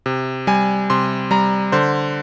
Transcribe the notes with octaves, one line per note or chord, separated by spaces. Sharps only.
C3
G3 G#5
C3 C6
G3 A#5
D3 C5